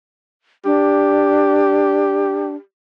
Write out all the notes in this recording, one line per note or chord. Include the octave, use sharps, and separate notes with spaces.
D4 G4